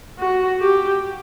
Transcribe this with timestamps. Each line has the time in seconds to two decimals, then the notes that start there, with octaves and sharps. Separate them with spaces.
0.19 F#4
0.60 G4